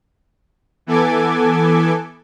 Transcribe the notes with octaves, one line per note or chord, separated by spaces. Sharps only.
E3 B3 A4 G#5 D6 G#6